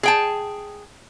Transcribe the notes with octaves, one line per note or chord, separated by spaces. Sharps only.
G#4 G5 A5